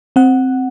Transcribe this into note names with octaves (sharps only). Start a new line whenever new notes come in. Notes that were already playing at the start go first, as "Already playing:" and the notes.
C4 F#5